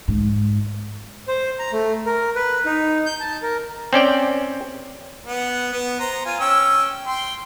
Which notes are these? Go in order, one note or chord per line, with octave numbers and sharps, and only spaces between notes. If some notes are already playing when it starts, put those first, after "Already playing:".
G#2
C5
A#5
A3
A#4
B4
D#4
G6
A5
A#4
C4 C#4 D5 G5
B3 F#5
B3
C5 A#5
F4 G#5
C#4 G5 E6
G5 C6